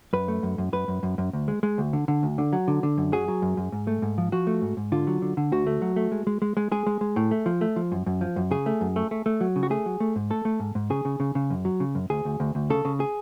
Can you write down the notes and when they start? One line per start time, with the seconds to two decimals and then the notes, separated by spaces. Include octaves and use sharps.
0.13 F#2 B4
0.28 A3
0.43 F#2
0.58 F#2
0.73 F#2 B4
0.88 F#2
1.03 F#2
1.18 F#2
1.33 D2
1.48 G#3
1.63 G#3
1.78 D2
1.93 D3
2.08 D3
2.23 D2
2.38 D3
2.53 F#3
2.68 D3
2.83 D3
2.98 F#2
3.12 F#3 G#4
3.28 F#3
3.42 F#2
3.57 F#2
3.72 G#2
3.87 A3
4.02 G#2
4.18 F3
4.32 F3 F#4
4.47 A3
4.62 G#2
4.77 G#2
4.92 D3 F4
5.07 F#3
5.22 D3
5.37 D3
5.52 D2 F#4
5.67 A3
5.82 F#3
5.96 A3
6.12 G#3
6.27 G#3
6.42 G#3
6.57 G#3
6.72 G#3 G#4
6.87 G#3
7.01 G#3
7.16 A2
7.31 A3
7.46 F3
7.61 A3
7.76 F3
7.92 F#2
8.06 F#2
8.21 F3
8.36 F#2
8.51 C#3 G#4
8.66 A3
8.81 F#2
8.96 A3
9.11 A3
9.26 A3
9.41 F#3
9.56 C#3
9.63 F#4
9.70 A3 G#4
9.86 F#3
10.00 A3
10.16 G#2
10.30 A3 A4
10.45 A3
10.60 G#2
10.75 G#2
10.90 C#3 G#4
11.05 C#3
11.20 C#3
11.35 C#3
11.50 F#2
11.65 F#3
11.80 C#3
11.95 F#2
12.10 D2 G#4
12.25 D2
12.40 D2
12.55 D2
12.70 C#3 A4
12.85 C#3
13.00 G#4